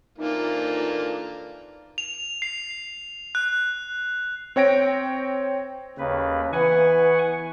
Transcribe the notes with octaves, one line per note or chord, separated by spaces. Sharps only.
F2 E3 A#3 D4 D#4 F4
F7
C7
F#6
C4 C#5 G5 A#6 D7
D#2 C#3 B4
E3 B3 B4 F#5 G#5 C#6